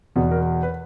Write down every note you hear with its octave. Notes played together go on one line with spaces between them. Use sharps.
E2 B2 B3
A#4
B4